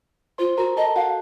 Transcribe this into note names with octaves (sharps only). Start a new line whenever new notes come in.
F4 C5 C6
F#4 A#4 A#5
A4 D#5 A5
F#4 F5 F#5